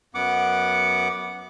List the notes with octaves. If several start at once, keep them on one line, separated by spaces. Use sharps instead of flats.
F#2 B3 F#5 D6